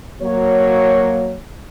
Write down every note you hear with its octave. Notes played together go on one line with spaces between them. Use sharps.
F#3 A#3 C#5